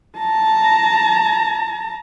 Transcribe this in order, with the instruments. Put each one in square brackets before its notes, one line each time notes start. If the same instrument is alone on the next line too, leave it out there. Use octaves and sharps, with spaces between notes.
[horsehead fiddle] A5 A#5